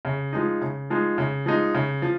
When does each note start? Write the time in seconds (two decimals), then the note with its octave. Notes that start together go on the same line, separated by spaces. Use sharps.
0.05 C#3
0.33 F3 G#3 D#4
0.61 C#3
0.90 F3 G#3 D#4
1.18 C#3
1.46 F3 G#3 D#4
1.75 C#3
2.02 F3